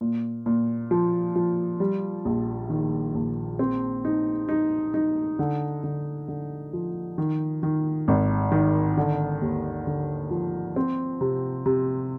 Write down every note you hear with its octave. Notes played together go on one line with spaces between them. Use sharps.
A#2
A#2
F3
F3
G3
A#1
D#3
A#1
C4
D#4
D#4
D#4
D3
D3
D3
F3
D#3
D#3
G#1
D#3
D3
D#2
D3
F3
C4
C3
C3